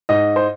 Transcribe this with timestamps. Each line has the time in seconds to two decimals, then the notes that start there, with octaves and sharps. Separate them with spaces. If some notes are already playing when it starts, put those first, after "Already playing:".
0.09 G#2 D#5
0.36 C5